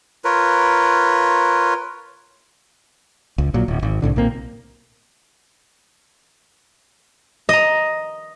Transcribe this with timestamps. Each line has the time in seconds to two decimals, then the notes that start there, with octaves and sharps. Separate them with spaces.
0.24 F4 A#4 B4 C#5
3.38 C#2
3.54 A#1 A#2 F#3
3.68 D1
3.83 G#1
4.02 C2 A2 D3
4.16 B1 A#2 A#3 C4
7.49 D#5 A#5